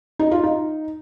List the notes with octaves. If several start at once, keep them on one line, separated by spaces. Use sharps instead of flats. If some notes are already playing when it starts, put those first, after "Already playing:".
D#4
F4
D#4